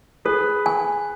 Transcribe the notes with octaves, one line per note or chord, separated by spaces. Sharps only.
G#4 A4 B4
G#5